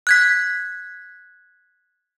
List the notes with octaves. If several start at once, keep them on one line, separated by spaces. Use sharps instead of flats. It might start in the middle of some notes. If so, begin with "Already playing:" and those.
F#6 G#6 B6